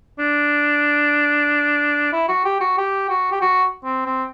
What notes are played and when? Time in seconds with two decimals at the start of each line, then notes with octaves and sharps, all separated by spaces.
0.19 D4
2.12 E4
2.28 F#4
2.45 G4
2.60 F#4
2.78 G4
3.09 F#4
3.32 G4
3.41 F#4
3.84 C4
4.05 C4